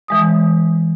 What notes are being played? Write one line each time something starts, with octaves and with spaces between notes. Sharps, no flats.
E3 G#3 D#6